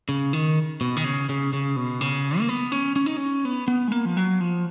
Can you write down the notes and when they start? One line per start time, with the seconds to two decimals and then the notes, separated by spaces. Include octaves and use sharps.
0.09 C#3
0.33 D#3
0.81 B2
0.97 D#3
1.04 C#3
1.29 C#3
1.53 C#3
1.76 B2
2.01 C#3
2.39 A#3
2.49 B3
2.72 C#4
2.96 C#4
3.06 D#4
3.17 C#4
3.45 B3
3.68 B3
3.88 G#3
3.92 A#3
4.05 F3
4.17 F#3
4.41 F3